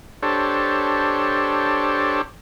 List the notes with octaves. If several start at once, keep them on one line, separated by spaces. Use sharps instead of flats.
D4 G4 A4 C5 C#5